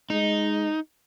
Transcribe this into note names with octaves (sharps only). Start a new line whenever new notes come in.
G#3 D#4